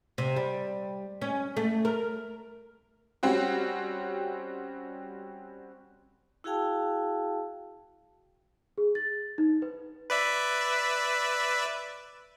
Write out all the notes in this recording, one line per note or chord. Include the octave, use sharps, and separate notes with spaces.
C3
G3
C#4
A3
A#4
G3 C4 C#4 F#4
E4 F#4 G#4 F5 G5 A5
G#4
A6
D#4
B4
B4 D5 E5